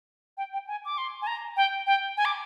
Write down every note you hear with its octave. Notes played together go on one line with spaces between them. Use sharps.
G5
G5
G#5
D6
C6
G#5
A#5
G5
G5
G#5
D6